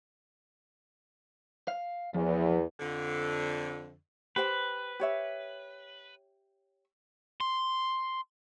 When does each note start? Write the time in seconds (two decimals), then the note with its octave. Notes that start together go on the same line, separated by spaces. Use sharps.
1.68 F5
2.14 E2 F3
2.80 F2 D3
4.36 G4 B4 C5 G5
5.00 G4 C#5 E5
7.41 C6